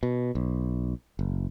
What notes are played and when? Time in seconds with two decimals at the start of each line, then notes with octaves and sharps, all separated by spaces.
0.03 B2
0.35 B1
1.19 F#1